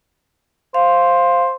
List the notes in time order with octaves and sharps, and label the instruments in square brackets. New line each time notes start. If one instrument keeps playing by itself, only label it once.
[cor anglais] C5 [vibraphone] F5